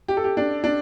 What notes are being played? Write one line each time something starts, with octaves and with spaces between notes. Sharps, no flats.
G4
A4
G4
D4
D4